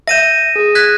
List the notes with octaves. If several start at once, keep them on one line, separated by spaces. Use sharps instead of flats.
E5 G6 A#6 D#7 E7
G#4
F#6 G#6 B6